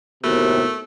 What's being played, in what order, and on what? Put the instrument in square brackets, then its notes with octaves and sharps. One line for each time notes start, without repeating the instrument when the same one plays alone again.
[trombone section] D#2 A2 C3 [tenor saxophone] A3 [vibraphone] B3 F#4 A#4